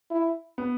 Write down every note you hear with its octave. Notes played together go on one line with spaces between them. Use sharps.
E4
B3